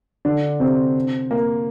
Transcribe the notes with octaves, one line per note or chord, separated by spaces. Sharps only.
D3 D4
C3 C4
A#3